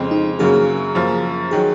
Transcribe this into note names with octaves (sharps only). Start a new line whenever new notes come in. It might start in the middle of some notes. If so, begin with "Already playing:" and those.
Already playing: F2 C#3 G#3 C4
D#4
F#2 C#3 F#3 A#3 G#4
F#2 F3 A#3
D#3 F#3 G#4